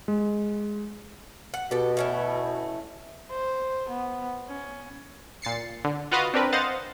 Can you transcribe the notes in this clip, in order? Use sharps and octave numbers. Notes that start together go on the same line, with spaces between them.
G#3
F#5
B2 G4 A4
A3 C#4 E4
C5
B3
C#4
A#2 A6 C7 C#7
D3
F4 F#4 B4 D#5 F5
C4 D4 A#4 B4
C5 D#5 F5 F#5 A6